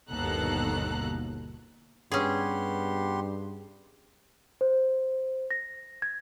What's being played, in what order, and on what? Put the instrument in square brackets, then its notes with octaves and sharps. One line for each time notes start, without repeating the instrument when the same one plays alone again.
[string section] G1 D#2 B2 A4 A#5 F#6
[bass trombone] G2 [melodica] B3 G4 C6 [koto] C#4 G#4
[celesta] C5
A#6
G#6